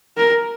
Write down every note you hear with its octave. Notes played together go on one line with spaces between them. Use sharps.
A#4